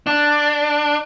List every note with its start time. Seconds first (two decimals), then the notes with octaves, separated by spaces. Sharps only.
0.07 D4